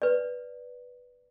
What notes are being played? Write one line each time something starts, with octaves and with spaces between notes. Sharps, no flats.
B4 D5